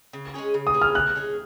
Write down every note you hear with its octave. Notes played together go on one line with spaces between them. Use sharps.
C#3
G#3 C#4 G#4
C#3
D#6
G#3 C#4 G#4
F6
C#3 F#6
G#3 C#4 G#4